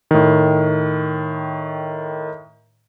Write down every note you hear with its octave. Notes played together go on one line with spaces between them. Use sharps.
A2 D#3